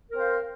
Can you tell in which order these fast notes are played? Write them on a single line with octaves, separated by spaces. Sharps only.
A#4 C4 C5 F5